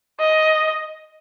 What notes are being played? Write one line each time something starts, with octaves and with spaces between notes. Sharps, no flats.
D#5